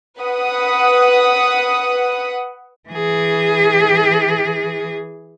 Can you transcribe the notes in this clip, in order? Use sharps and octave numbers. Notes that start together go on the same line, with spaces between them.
B4 F#5 D#6
E3 G#4